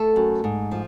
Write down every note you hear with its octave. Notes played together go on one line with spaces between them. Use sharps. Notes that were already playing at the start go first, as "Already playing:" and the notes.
Already playing: A3 A4
F#2
G#2
F3